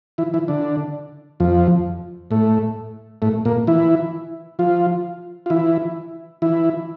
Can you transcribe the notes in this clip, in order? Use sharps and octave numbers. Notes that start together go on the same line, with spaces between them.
E3 E4
E3 E4
D3 D4
F2 F3
A2 A3
A2 A3
A#2 A#3
E3 E4
F3 F4
F4
E3 E4
E3 E4